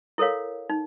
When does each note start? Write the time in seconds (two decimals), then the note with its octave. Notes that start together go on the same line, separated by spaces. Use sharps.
0.18 E4 A4 A#4 C#5 F5
0.70 D#4